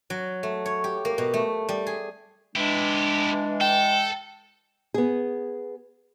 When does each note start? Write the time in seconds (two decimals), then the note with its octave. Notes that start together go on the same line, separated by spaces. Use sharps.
0.10 F#3
0.43 A3
0.66 C#5
0.84 G4
1.05 A#3
1.18 B2
1.34 A3
1.69 G3
1.87 G#4
2.56 E3 G#3 D4 E4 G4
3.61 A4 G5
4.94 B3 G#4